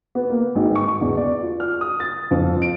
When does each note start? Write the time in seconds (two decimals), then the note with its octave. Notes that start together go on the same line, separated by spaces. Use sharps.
0.15 B3
0.30 A#3
0.55 G#1
0.75 C#6
1.01 E2
1.17 D5
1.43 F4
1.60 F6
1.81 D#6
2.00 A6
2.31 F2
2.62 D7